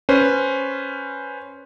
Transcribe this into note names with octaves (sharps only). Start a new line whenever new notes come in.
C#4 B4 C5